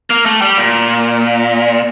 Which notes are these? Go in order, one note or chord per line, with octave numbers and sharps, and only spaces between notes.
A#3
A3
G3
A#2